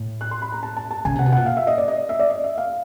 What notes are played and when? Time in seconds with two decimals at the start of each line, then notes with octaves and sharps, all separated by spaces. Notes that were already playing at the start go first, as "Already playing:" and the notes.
Already playing: A2
0.21 F#6
0.31 C6
0.42 B5
0.52 A#5
0.63 A5
0.77 A5
0.91 A5
1.05 C#3 G#5
1.15 C3 F#5
1.26 B2
1.32 A#2 F#5
1.46 F5
1.57 E5
1.67 D#5
1.78 D5
1.88 D#5
2.09 E5
2.19 D5
2.30 D#5
2.44 E5
2.58 F5